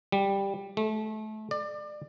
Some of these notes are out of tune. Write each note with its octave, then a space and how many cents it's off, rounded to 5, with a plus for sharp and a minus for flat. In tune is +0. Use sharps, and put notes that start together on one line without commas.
G3 +5
A3 -25
D5 +25